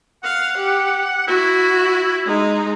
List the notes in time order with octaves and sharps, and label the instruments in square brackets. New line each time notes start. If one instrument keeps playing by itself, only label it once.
[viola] F5 [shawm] F#5
[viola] G4
[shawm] E4 [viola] F#4
[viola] G#3 D#4